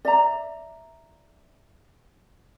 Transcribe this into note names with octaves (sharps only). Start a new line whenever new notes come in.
D5 E5 A#5